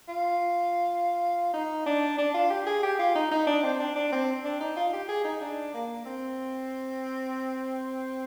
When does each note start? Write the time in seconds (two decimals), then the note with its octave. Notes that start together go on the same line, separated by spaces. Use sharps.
0.08 F4
1.53 D#4
1.86 D4
2.18 D4
2.34 F4
2.50 G4
2.66 G#4
2.83 G4
2.99 F4
3.15 D#4
3.31 D#4
3.47 D4
3.63 C4
3.79 D4
3.96 D4
4.12 C4
4.45 D4
4.60 D#4
4.76 F4
4.93 G4
5.09 G#4
5.24 D#4
5.41 D4
5.74 A#3
6.05 C4